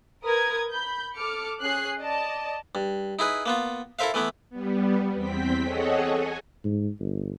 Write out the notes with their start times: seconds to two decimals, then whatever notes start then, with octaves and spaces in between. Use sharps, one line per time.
0.24 A#4 B4 D#6 G#6
0.71 B5 G6
1.16 A4 D6 F6 C#7
1.61 C#4 G#4 F#6 C7
2.00 D5 D#5 A5
2.75 G2
3.19 D#4 E4 G#4 B4
3.46 A#3 B3 F4
3.99 E4 A4 A#4 C5 E5 F5
4.14 E3 A3 B3 E4
4.50 G3 B3
5.15 E2 C4 G5 B6
5.62 G#4 A4 C#5 D#5 F#5
6.07 G#5
6.65 G#2
7.00 G1